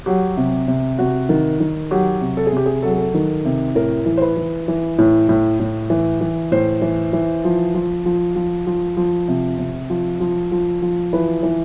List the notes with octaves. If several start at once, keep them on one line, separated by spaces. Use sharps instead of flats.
F#3 G4
C3
C3
C3 F#4
D#3
D#3
F#3 G4
C3
A4
G#4
C3 G4
G#4
F#3 A4
G#4
A4
D#3
C3
A2 A#4
E3
C5
B4
E3
E3
A2
A2
A2
E3
E3
A2 C5
E3
E3
F3
F3
F3
F3
F3
F3
C3
C3
F3
F3
F3
F3
E3 B4
E3